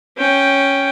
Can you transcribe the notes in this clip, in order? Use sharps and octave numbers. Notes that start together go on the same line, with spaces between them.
C#4 G5